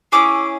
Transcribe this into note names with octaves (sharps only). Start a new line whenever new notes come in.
C#4 E4 G#4 D6